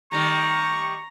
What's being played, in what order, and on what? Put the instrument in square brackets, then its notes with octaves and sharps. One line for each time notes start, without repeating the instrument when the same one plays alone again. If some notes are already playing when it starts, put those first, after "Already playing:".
[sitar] D#3 G3 A3 [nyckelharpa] A#5 [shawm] C#6